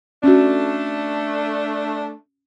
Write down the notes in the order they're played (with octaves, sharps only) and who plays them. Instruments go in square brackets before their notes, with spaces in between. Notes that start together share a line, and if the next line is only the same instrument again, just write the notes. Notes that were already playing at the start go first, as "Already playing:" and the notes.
[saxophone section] A3 D4 [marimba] C#4 F#4